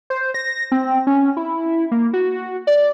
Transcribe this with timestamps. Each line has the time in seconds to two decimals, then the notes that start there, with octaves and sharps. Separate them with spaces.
0.10 C5
0.34 A#6
0.72 C4
1.07 C#4
1.37 E4
1.91 A#3
2.13 F#4
2.67 D5